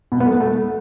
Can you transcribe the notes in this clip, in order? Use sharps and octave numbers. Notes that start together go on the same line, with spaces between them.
B2
B3
A3
A3